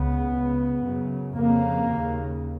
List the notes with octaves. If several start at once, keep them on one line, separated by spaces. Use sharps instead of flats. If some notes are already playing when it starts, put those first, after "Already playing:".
Already playing: C#2 C#3 B3
C#2 C#3
F#2 C#3
F2 C#3 A#3
D#2 C#3